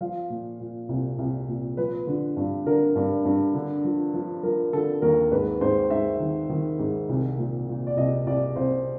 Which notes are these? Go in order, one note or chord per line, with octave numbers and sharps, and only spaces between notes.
F3 F5
A#2
A#2
C2
C2
A#2
F3 B4
D3
G2
D3 A#4
G2
G2
D3
F3
F3
F3 A#4
D3 A4
D#2 A#4
G#2 B4
G#2 C5
G#2 E5
D#3
D#3
G#2
C2
A#2
A#2
D5
C2 D#5
C2 D5
C2 C5